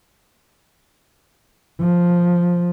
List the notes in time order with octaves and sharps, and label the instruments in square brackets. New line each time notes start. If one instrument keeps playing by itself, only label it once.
[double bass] F3